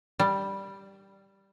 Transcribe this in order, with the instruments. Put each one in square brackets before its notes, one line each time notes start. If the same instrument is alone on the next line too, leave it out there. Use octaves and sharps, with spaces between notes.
[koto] G3